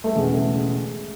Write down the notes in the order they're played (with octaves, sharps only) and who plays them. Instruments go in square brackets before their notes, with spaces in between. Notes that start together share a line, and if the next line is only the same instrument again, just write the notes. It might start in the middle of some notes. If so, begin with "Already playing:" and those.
[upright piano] A3
[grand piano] E1 E2 C#3 [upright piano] G#3
[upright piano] A3
G#3